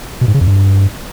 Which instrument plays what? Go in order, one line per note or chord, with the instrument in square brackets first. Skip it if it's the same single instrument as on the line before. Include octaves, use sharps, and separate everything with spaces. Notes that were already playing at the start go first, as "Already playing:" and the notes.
[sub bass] B2
G#2
C#3
F2
G2